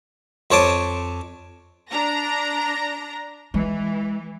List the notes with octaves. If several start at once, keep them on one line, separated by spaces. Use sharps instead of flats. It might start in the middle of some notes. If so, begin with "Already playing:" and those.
F2 C5 C#5 A5 D6 D#6
D4 A#5 A#6
E3 G#3